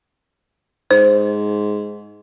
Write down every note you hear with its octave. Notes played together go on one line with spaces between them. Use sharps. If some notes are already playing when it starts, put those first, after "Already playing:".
G#2 C5